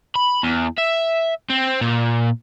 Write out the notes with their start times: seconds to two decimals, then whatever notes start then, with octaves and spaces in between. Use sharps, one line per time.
0.16 B5
0.44 E2
0.78 E5
1.50 C4
1.81 A#2